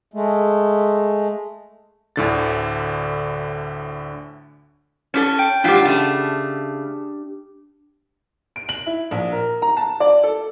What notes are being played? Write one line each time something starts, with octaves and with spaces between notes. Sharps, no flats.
G#3 A3
D2 A2 D3 A6
C#4 D4 A4
G5
G#2 F#3 D4 F4 G4
C#3 A3
D7
F#7
E4
A#1
A#4
A#5
A5
D5
A4